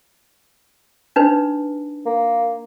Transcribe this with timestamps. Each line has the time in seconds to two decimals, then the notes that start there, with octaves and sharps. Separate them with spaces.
1.16 D4 D#4 B4
2.06 A#3